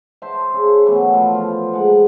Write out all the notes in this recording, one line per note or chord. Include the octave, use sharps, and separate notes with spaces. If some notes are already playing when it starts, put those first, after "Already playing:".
C5 E5 A5 C6
C#3
E3 F#3 A3 B3
F3
F3 F4
G#3 F#5